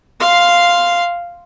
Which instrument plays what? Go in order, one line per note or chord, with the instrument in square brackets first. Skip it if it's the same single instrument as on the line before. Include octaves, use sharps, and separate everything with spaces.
[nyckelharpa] F5 C6